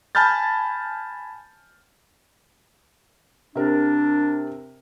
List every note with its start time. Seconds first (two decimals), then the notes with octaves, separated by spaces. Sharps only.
0.15 G#5 A5 B5 F6 G6 A6
3.55 C3 D4 A#4